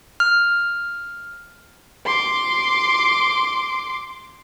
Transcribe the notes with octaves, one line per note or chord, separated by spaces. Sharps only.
F6
C6 D6